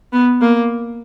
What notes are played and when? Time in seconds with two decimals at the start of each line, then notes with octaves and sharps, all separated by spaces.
0.13 B3
0.41 A#3